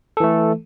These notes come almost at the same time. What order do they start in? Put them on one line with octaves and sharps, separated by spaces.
A4 E3 A3